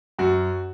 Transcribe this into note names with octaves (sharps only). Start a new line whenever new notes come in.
F#2 F#4